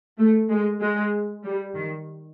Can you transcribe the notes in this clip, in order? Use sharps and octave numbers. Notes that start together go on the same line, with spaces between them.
A3
G#3
G#3
G3
D#3